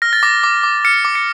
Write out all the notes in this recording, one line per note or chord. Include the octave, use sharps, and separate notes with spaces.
F6 A#6
A6
D6 A#6
D6
D6
F6 C#7
D6
C#7